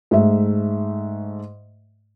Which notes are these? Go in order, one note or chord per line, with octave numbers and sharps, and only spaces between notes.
G#2 A3 E5